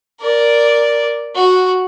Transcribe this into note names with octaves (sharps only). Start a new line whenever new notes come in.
A#4 D5
F#4